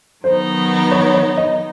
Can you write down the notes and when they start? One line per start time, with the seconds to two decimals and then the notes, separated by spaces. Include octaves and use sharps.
0.23 D#3 F#3 B3 D#4 C5
0.91 C#5
1.14 C#5
1.37 D#5